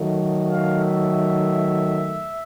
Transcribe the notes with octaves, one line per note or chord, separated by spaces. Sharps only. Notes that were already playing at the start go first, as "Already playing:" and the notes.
Already playing: D#3 F#3 A3
F5
E5